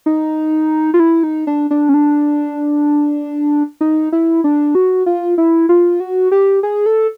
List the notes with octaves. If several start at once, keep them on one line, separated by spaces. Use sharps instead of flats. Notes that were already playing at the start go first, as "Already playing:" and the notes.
D#4
F4
E4
D#4
D4
D4
C#4
D4
D#4
E4
D4
F#4
F4
E4
F4
F#4
G4
G#4
A4